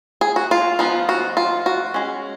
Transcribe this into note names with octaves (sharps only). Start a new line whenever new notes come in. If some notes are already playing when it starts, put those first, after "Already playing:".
G#4
F#4
F4
F3 B3 D#4 F4
F#4
F4
F#4
G#3 C#4